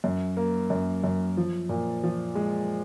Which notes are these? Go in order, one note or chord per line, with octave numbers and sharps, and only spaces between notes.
F#2
A#3
F#2
F#2
F3
A#2
F3
G#3